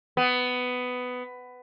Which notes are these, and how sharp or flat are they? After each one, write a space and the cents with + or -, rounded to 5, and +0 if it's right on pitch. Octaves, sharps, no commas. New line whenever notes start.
B3 +15